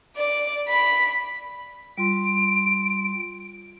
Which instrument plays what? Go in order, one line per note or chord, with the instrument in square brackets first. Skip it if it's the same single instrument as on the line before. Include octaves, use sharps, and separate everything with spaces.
[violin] D5
B5
[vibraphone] G3 F4 C6 [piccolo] D7